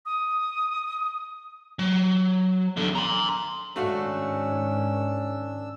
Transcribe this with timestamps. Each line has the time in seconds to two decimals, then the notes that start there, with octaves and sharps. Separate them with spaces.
0.05 D#6
1.79 F#3
2.77 E2 D3
2.95 A#5 C6
3.76 G#2 D#3 A3 C#4 D4 F#4 F5 E6